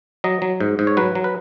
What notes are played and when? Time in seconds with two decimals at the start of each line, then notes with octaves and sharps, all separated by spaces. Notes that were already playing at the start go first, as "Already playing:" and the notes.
0.24 F#3 D#5
0.42 F#3
0.60 G#2
0.79 G#2
0.87 C#5
0.97 F#3 B4
1.15 F#3
1.24 B4